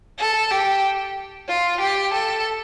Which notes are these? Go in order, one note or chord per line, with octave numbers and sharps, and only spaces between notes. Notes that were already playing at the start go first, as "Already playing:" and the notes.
A4
G4
F4
G4
A4